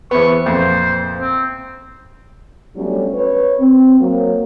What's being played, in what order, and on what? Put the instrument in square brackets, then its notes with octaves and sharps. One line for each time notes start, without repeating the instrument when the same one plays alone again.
[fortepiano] E2 B3 [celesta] B4 C5 [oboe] C#6
[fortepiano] F2 A#2 [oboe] C5 [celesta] E5
[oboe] C4
[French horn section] F#3 G3 A3 B3 C#4 D4
B4 C#5
C4
F#3 A#3